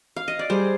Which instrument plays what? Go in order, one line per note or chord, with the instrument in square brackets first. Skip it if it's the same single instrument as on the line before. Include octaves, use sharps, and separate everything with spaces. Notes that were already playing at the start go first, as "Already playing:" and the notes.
[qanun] F5
D#5
D5
[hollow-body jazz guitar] G3 [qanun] G#4 C5